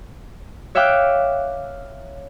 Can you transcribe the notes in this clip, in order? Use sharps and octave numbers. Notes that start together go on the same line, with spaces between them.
C#5 E5 F5 G5 D6 F#6